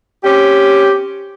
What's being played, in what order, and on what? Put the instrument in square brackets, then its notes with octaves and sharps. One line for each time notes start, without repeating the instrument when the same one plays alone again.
[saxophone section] C4 C#4 G4